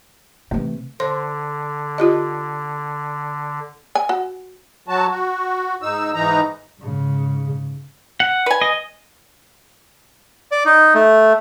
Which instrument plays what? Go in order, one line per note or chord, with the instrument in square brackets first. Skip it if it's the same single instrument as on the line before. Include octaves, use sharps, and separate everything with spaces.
[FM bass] C3 [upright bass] E3 A3
[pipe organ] D3 [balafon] C5 C6
[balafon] F4 G4 D#5
[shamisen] G#5
F#4
[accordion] F#3 F#4 A5
F#4
G#2 D#4 E6
G#2 E3 D#4 A#5
[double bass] G#2 C#3
[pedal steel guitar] F#5
[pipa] B4 G#5
[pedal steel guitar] D#5
[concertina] D5
D#4
A3